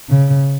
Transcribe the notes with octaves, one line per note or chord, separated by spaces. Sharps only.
C#3